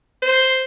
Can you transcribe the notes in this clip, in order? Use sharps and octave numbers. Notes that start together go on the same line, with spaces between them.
C5